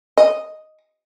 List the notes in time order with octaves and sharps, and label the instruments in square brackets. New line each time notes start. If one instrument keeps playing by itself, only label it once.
[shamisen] D#5